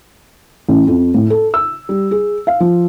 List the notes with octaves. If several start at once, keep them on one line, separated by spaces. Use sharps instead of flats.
A1
F2
A2
A4
E6
G3
G#4
F5
F3